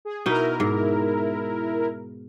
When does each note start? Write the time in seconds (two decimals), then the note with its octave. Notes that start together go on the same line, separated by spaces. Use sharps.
0.05 G#4
0.26 B2 D#4 E4 A#4
0.60 G#2